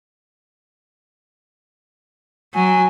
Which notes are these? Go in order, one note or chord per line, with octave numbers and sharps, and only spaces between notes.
F#3 G#5